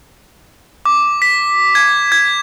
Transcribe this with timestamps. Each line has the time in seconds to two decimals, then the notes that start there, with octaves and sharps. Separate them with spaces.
0.86 D6
1.22 B6
1.75 G#6
2.12 G#6